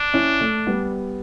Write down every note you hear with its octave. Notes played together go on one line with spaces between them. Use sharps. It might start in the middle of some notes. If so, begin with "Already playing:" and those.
Already playing: D4
C#4 E4
A3
G3 B3